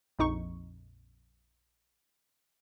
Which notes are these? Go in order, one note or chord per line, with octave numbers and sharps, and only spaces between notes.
A#1 F2 D#4 C#6